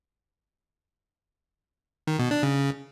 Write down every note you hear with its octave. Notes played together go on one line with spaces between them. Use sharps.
D#3
B2
D4
C#3